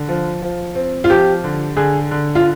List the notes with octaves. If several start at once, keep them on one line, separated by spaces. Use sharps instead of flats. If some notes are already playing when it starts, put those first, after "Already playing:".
Already playing: D3
F3
F3
C4
F4
F3 G4
D3
D3 G#4
D3
F4